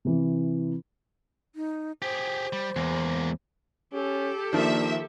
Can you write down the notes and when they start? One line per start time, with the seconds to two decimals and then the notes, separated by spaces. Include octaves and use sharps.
0.05 C3 E3
1.55 D#4
2.02 G4 G#4 C5
2.53 G3
2.76 E2 G#3 A#3
3.93 C#4 G4 A4
4.53 D#3 F3 A#3 D4 E5